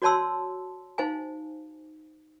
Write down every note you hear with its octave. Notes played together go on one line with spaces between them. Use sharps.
F#4 C#5 D5 A5 C6 E6
D#4 C5 F5 G#5